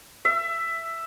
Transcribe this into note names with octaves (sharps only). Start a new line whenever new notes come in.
E5